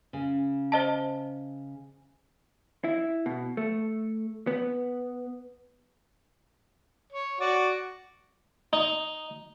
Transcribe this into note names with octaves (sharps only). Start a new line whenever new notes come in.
C#3
C5 D#5 A5
E4
B2
A3
B3
C#5
F#4 D5
D#4